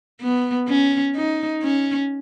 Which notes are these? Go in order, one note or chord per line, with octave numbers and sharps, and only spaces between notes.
B3
C#4
D#4
C#4